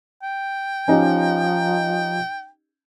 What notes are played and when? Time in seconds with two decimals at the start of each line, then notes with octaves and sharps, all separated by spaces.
0.23 G5
0.88 F3 C#4 D#4 G4